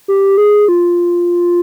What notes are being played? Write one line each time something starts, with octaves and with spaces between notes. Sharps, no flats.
G4
G#4
F4